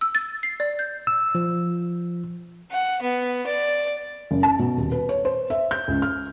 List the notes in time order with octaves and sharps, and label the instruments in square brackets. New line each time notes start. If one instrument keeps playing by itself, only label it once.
[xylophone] E6
A6
C7
D5
G6
[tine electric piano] E6
F3
[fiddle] F#5
B3
D5
[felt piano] F#1
A5
B2
D#1
B4
C#5
C5
E5
G6
C#2
F6